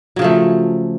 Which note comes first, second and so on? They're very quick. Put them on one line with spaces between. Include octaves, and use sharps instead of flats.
F#3 C#3 F3 A3